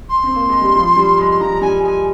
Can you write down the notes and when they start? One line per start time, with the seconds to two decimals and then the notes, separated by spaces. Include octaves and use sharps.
0.09 C6
0.23 C4
0.36 A#3
0.49 G#3
0.61 G3
0.75 F3
0.97 G3
1.18 G#3
1.31 C6
1.40 F3 A#5
1.62 G3 G#5
1.83 G#3 G#5